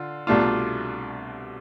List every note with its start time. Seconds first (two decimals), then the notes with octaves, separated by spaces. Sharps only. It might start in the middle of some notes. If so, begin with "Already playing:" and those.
Already playing: D3 F4
0.27 C2 B2 A3 D4 F4